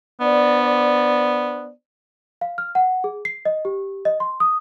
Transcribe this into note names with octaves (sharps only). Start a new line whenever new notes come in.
B3 D4 C5 D5
F5
F6
F#5
G#4
C7
D#5
G4
D#5
C6
D#6